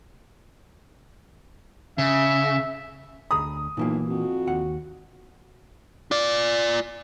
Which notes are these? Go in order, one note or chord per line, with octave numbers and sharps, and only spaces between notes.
C#3 E5
D2 A#5 B5 D#6
B1 A#2 E3 A#3
F2 F#4
D#2 F#5
F4 D5